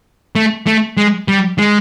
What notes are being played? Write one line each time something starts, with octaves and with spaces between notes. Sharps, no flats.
A3
A3
G#3
G3
G#3